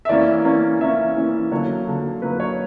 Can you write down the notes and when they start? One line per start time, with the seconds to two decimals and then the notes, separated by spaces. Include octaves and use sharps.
0.05 E5
0.09 E3 A#3 C#4 D5
0.45 E3 A#3 C#4
0.80 E3 A#3 C#4 E5
1.16 E3 A#3 C#4
1.51 D3 F#3 A#3 C#5
1.87 D3 F#3 A#3
2.22 D3 F#3 A#3 B4
2.40 C#5